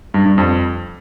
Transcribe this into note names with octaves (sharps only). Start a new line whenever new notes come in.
G2
G2
F2